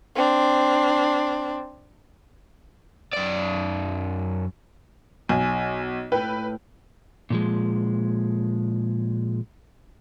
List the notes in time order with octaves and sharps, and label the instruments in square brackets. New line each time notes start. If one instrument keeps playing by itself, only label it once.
[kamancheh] C4 D4
[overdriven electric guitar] F#2 D5
[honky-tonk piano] B1 [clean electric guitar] G#5
[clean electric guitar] A2 G5 [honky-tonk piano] B4
[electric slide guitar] A#2 F3 G#3